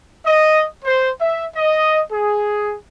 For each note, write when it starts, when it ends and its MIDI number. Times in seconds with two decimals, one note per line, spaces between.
0.24 0.65 75
0.84 1.09 72
1.19 1.45 76
1.55 2.01 75
2.11 2.76 68